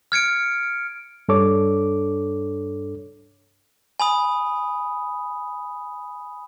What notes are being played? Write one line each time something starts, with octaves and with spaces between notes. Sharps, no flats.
F6 G#6 C#7 D7
G2 D4 A4 C#5 D6
G#5 B5 D#6